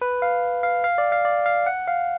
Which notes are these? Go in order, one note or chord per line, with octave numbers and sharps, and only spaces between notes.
B4
F5
F5
F5
D5
F5
D5
F5
F#5
F5